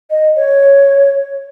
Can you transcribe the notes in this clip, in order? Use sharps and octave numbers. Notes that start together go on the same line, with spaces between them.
D#5
C#5